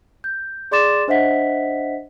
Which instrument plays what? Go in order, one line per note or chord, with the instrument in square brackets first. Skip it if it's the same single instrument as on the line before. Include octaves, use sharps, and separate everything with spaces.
[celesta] G6
G#4 D5 C6 D6 A6 E7
D4 C5 D#5 E5 F#5 B6